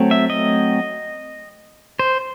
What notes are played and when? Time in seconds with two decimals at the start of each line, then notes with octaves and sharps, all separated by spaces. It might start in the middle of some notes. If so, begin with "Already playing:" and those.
Already playing: F#3 A3 C4
0.11 E5
0.30 D#5
1.99 C5